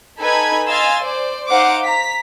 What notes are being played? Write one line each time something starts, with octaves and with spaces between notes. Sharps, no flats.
D#4 A4 B4 G#5 B5 G#6
D#5 F5 G#5 C6 E6 A6
C5 D5
D#4 C5 F5 F#5 D6
A#5 B6